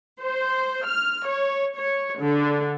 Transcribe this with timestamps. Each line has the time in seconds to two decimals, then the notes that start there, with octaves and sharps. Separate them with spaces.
0.20 C5
0.86 F6
1.27 C#5
1.76 C#5
2.21 D3